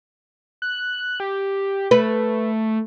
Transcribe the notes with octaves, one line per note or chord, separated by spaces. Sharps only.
F#6
G4
A3 B4